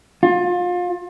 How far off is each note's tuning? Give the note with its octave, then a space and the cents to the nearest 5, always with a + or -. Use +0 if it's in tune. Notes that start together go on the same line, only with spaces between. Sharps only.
F4 +30